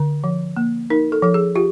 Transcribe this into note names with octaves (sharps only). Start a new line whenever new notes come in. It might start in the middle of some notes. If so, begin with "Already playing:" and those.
Already playing: D3
F3
A#3
D#4 A#4
A4
F3 A4
G#4
F4 G4